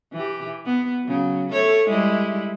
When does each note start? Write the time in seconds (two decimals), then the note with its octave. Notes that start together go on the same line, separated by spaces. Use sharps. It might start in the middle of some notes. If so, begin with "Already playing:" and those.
0.12 E3 G4
0.66 B3
1.05 C#3 F#3
1.52 A3 A4 C#5
1.89 G3 G#3 E4